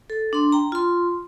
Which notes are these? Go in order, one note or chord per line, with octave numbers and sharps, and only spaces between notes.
A4
D4 C6
G5 A#5
F4 C6